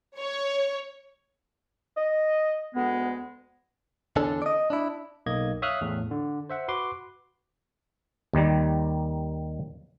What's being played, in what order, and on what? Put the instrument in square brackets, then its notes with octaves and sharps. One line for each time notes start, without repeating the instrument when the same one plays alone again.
[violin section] C#5
[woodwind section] D#5
[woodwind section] D2 G#3 [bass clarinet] B3
[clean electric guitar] E2 D3 C#4 D4 A4
D5 D#5
D4 E4
[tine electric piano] B1 A#3 D#5 G#6
C#5 E5 F5 D#6 F6 F#6
E2 A2
D3
C5 E5 F#5
F#4 B4 C6 D6
[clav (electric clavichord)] D#2 D#3 G3